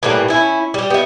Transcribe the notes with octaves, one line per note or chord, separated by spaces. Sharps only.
A2 E3 G3 A#3
C#4 E4
G3 G4
B3 E5